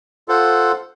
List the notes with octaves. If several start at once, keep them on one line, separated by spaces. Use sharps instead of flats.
F4 A4 C5 F#5